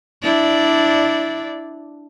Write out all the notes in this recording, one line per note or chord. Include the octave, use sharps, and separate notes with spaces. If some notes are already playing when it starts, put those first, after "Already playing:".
D4 E4 D5